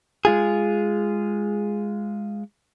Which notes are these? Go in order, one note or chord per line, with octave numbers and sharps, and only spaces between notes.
G#3 F4 G#4